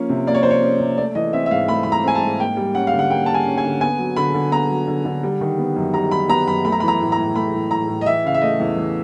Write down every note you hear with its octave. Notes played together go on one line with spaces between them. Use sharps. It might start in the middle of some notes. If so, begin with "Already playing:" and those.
Already playing: F3 A#3 C#4
C3
A#3 D5
C#5
F3 C5
C#5
C#4
C3
A3 D5
E3 D#5
C4 E5
E5
G#2 F5
A3 B5
E3 B5
A#5
C4 G#5
A5
G#2
A#3 G5
G3
C#4 F#5
F5
D3
F#5
A#3 G5
G3 A5
G#5
C#4
G#5
D3
B3 G#5
F#3
D3 B5
D3
B3 A#5
F#3
D3
D3
G3
D#3
B3
F#2
G3 A#5
D#3 B5
B3 A#5
F#2 B5
A3 B5
A#5
E3 B5
A#5
A2
A#5
A2
A3 B5
E3
A2 A#5
A2
D#5
E3 E5
C#3 F5
E5
A3 D#5
E2
E3